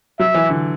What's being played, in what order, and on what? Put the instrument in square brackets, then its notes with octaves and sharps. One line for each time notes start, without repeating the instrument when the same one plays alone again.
[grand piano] F#3 [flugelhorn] E5
[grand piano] E3
D3